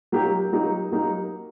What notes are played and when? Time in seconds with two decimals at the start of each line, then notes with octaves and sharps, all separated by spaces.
0.12 F#3 A#3 D#4 G4
0.52 F#3 A#3 D#4 G4
0.92 F#3 A#3 D#4 G4